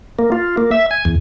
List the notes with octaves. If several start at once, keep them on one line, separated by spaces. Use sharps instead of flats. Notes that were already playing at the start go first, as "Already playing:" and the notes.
A#3
F4
A#3
E5
G#5
E2